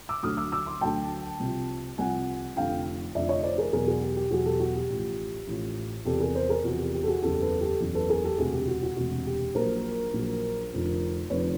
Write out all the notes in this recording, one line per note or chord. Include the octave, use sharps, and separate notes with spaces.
D6 E6
D2 D3 F#3 D#6 F6
D6 E6
D6 E6
C6 D6
D2 D3 F#3 G5 A5
C2 C3 F3
C2 C3 F3 F#5 G#5
F1 F2 D3 F5 G5
F1 F2 D3 D5 E5
C#5 D#5
C5 D5
G#4 A#4
E2 B2 F#3 G#4 A#4
F#4 G#4
G4
G4
E2 B2 F#3 F#4 G#4
G4 A4
F#4
G4
A1 A2 F3
A1 A2 F3
E2 C3 F3 G4 A4
G#4 A#4
A#4 C5
G#4 A#4
E2 C3 F3 F#4
G4
G4
A4
F#4 G#4
F#1 E2 C#3 E3 G4 A4
A4 B4
G4 A4
F#1 E2 C#3 E3
A4 B4
G#4 A#4
G4 A4
E1 D2 C3 F#4 G#4
G4
F#4
F#4
E1 D2 C3 F#4
G4
A#1 A#2 F#3 A#4 C5
A#1 A#2 F#3
F1 F2 D3 F3
F1 F2 D3 F3 B4 C#5